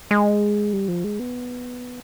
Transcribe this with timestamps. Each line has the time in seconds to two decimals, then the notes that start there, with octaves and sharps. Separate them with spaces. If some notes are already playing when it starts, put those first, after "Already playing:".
0.11 G#3
0.73 G3
0.88 F3
1.04 G#3
1.19 B3